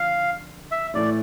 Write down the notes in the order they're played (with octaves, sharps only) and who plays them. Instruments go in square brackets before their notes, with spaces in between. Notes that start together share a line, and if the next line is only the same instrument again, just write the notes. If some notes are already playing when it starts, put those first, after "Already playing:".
Already playing: [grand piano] D3 F3 [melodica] F5
[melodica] E5
[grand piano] A2 E3 A3 E4 [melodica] D5